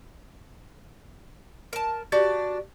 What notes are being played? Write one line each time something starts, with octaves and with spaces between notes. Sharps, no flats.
A#4 A5
D4 F#4 G4 D5